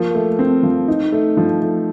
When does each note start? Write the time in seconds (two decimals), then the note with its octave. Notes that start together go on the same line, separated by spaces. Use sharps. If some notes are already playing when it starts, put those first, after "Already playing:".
Already playing: F3 A#3
0.15 A3
0.39 C4
0.63 F3
0.88 D#4
1.12 A3
1.37 F3
1.61 A3